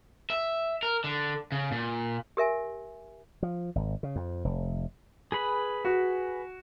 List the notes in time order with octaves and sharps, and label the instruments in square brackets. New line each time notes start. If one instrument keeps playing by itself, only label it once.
[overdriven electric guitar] E5
A#4
D3
C#3
A#2
[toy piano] G4 A#4 E5 G#5
[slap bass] F3
G#1
C#3
F2
F1
[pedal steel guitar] G#4 B4 B5
[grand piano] F#4